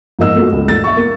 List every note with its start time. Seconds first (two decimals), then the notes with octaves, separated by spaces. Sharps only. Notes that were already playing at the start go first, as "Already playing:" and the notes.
0.19 G#2 F3 A#3 D#5 E6
0.35 A3 A#3 F#4
0.52 C#2
0.68 A#1 A3 A6
0.84 E5 C#6
0.97 A#3